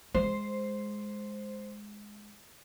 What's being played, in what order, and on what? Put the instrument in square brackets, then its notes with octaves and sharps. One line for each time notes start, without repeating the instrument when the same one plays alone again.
[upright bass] G#3 [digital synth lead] C5